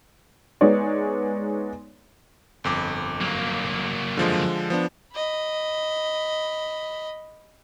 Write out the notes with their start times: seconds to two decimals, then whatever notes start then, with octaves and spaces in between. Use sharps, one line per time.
0.61 G#3 B3 D#4 C#5 D5
2.64 G1 F2 D6
3.21 F#3 A#3
4.17 D3 F3 G#3
4.70 F3 B3 D4
5.13 D#5 B5